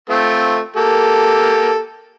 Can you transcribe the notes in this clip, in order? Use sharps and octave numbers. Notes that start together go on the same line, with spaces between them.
A3 C4 F4
A#3 G4 A4